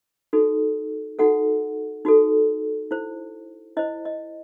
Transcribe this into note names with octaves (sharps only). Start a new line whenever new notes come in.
D#4 F#4 A4
D#4 F#4 A4 F#5
D#4 F#4 A4
E4 C5
E4 C5 D#5
D#5